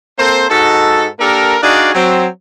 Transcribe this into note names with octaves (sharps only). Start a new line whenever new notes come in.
A#3 C4 A4 C5
G#2 D#4 F#4 A4
A#3 D4 G4 A4 A#4
D4 D#4 F#4 G#4 D5 F5
F#3 C4